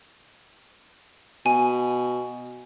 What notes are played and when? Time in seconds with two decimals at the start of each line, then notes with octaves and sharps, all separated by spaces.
1.46 B2 G#5